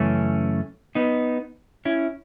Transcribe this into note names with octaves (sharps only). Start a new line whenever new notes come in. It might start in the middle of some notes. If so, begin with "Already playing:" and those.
Already playing: F#2 C#3 E3 A3 C#4
B3 D#4
C#4 E4